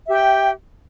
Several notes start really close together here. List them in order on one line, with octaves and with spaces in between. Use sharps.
E5 G4 G5